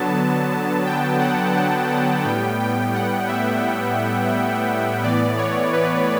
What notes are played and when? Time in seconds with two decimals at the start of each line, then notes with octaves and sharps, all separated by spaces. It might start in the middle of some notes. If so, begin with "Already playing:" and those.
Already playing: D3 F#3 B3 A5
0.85 G5
1.20 F#5
1.55 F#5
1.89 F#5
2.25 A2 G3 B3 G5
2.60 G5
2.94 F#5
3.28 E5
5.03 A2 E3 B3 D5
5.38 C#5
5.73 B4